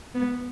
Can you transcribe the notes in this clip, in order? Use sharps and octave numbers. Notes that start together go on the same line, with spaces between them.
B3